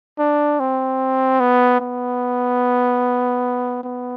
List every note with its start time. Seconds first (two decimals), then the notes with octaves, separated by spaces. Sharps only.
0.19 D4
0.60 C4
1.40 B3
1.80 B3
3.83 B3